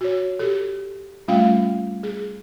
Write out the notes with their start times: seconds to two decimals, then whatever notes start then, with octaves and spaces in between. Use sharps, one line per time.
0.01 F#4 C#5
0.39 G4 A4
1.28 G3 A3 C#4 F4 F5 G5
2.03 G#4